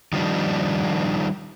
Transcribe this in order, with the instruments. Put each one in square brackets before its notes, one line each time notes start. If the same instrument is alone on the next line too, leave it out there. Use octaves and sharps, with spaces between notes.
[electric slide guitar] D#3 F3 G3 D4 D#4